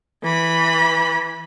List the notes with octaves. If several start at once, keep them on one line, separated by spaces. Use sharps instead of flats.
E3 B5